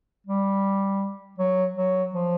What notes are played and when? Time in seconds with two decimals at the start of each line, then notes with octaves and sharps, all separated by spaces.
0.26 G3
1.38 F#3
1.77 F#3
2.14 F3